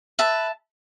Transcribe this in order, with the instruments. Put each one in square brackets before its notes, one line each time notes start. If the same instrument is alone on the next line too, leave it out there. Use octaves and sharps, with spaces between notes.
[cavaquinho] B4 E5 A5